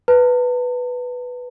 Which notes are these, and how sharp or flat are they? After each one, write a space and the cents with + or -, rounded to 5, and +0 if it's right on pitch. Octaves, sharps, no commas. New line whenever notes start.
B4 +0 A5 +45